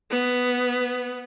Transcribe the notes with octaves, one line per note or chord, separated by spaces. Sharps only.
B3